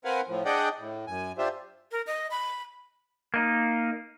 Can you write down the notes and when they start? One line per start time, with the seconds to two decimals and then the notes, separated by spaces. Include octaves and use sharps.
0.05 C4 A#4 B4 F5 F#5 G#5
0.28 A2 F3
0.45 D4 G#4 D5 D#5 F#5 G5
0.79 A2
1.07 F#2 G#5
1.38 D4 F4 G4 C5 E5
1.92 A#4
2.07 D#5
2.31 B5
3.34 A#3 D#4